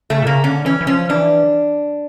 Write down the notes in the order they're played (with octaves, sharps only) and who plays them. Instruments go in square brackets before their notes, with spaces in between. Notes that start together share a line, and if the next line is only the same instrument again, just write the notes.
[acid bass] C#3 [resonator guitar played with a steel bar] A3
[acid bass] A#2
[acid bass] C#3 [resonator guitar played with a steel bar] A#3
[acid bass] D3 [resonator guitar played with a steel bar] C#4
[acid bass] E3 [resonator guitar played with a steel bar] C#4
[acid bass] E3
[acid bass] F3 [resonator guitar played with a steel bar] C#4
[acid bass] E3 [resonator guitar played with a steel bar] D4